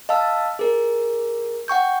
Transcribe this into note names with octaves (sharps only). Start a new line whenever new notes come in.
D#5 F5 A5 E6
G#4 A#4
F#5 G5 C#6 G6